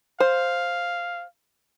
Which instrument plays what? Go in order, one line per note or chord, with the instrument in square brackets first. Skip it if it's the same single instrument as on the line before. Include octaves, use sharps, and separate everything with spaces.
[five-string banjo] C5 [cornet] F5